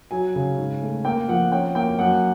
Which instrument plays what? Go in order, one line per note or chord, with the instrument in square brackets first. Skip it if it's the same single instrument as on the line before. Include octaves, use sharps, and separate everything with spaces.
[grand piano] F#3 G#5
C#3
G#2
A3
A#3 G5
F3 F#5
C#4 G5
A#3 G5
F#2 F#5